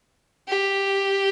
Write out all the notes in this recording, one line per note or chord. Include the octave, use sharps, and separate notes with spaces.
G4